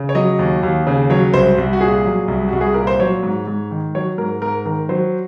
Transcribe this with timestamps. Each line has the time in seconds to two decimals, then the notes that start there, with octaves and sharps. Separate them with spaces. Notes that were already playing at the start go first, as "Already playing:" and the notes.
Already playing: C#3
0.09 C#5
0.15 F#3 D#5
0.39 D#2
0.63 D#2
0.87 C#3
1.10 F#3 C#5
1.34 C2 C5
1.58 C2
1.73 F#4
1.81 A#2 G#4
2.05 F#3
2.28 C2
2.48 C2 F#4
2.61 G#4
2.74 A#2 A#4
2.87 C5
3.00 F#3 C#5
3.23 G#2
3.47 G#2
3.71 D#3
3.95 F#3 C#5
4.18 G#2 A#4
4.42 G#2 A#4
4.65 D#3 A#4
4.89 F#3 C5